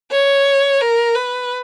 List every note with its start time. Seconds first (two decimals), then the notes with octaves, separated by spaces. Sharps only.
0.11 C#5
0.81 A#4
1.15 B4